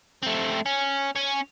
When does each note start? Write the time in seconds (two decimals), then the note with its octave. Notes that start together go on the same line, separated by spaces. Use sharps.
0.23 A3 C4
0.66 C#4
1.16 C#4